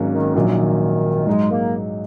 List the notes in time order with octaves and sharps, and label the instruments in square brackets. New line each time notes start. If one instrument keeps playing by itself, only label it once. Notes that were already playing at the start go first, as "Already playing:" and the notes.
Already playing: [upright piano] G#1 G#2 F#3 A#3 C#4
[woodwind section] D#3
[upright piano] A#1 A#2 F#3 D#4 [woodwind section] D#3
[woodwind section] D#3
[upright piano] G#2 F#3 D#4 G#4 [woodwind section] G#3
[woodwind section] A#3